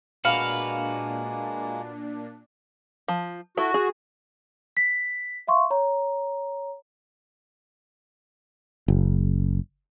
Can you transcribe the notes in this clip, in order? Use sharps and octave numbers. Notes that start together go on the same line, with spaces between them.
A#2 G#3 A#3 D4 F#4 B4 F5
F3
E4 F#4 A4
G#4
B6
E5 F5 C6 C#6
C#5 A#5
F#1